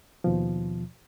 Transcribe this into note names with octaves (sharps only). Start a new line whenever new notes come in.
D#2 B2 F3